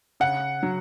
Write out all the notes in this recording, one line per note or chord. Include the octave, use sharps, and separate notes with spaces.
C#3 F#5
F#3